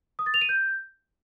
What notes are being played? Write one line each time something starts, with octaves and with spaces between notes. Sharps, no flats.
D#6
A6
F7
D#7
G6